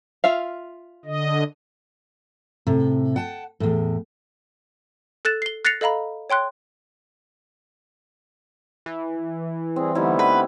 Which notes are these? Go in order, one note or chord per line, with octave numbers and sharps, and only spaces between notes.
F4 E5 F5
D3 D#5
A2 C3
F#5 G5 A5
E2 A2
A4 F#6 A6 E7
C7 G7
F#6 A6 A#6 C7 C#7 F7
A4 D#5 F5 A#5 B5
C#5 G5 C6 F#6
E3
G3 C4 G#4
D3 G3 A3 B3 D#4 E4
B4